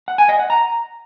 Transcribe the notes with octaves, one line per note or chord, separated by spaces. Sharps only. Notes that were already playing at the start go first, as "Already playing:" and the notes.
F#5
G#5
D#5
F#5
A#5